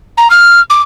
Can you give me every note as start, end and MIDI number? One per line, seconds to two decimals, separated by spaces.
0.17 0.27 82
0.30 0.60 89
0.70 0.81 86